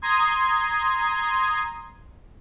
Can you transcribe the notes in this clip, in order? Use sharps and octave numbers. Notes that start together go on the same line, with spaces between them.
A#5 C6 D#6 G#6